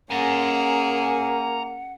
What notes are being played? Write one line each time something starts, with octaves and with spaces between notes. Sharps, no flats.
A#3 C#4 G#4 F#5 G#5 A#5